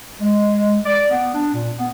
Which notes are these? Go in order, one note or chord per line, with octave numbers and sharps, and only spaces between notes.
G#3
D5
B3
D4
A#2
B3